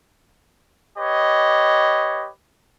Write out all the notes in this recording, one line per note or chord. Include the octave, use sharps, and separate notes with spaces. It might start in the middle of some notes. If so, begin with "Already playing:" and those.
G4 B4 C#5 D#5